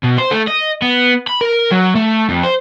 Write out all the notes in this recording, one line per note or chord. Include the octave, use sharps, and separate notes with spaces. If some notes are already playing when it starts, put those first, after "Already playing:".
B2
C5
A3
D#5
B3
B5
A#4
F#3
A3
F2
C5